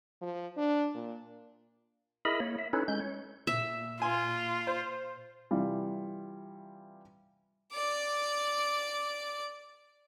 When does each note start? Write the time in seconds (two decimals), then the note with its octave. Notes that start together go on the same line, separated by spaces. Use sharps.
0.21 F3
0.57 D4
0.94 A#2
2.25 E4 G#4 A#4 D#5 E5 B5
2.40 A#3 C#5
2.59 E5
2.73 C#4 D#4 E4 A4 B4 C#5
2.88 G#3 C#4 G6
3.00 C#5
3.47 A#2 E5
4.02 F4 G#5 C6
4.67 C5
5.51 C3 E3 G3 F4
7.72 D5 D6